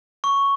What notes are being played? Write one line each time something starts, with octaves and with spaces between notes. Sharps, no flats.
C#6